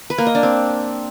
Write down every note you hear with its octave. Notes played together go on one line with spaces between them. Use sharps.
B4
A#3
D#5
D4
C4